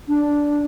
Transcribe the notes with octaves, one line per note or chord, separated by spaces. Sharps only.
D4